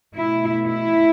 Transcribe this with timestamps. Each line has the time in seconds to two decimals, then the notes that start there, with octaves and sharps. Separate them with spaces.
0.15 B2 A3 E4
0.69 E4